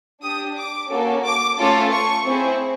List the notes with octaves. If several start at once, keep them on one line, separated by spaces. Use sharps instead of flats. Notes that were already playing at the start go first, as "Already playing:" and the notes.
D4 G4 D#6
D6
A#3 C#4 F#4 A4
D6
A3 C#4 F4 A4
C#6
C4 E4 G#4